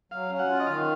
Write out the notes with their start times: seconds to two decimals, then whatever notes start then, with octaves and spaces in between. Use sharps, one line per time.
0.11 F#3 F5
0.30 C#4
0.39 F#5
0.49 F4
0.60 D#5
0.67 D#3 F5